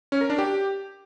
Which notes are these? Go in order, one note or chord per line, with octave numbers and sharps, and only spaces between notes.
C#4
A#4
D4
G4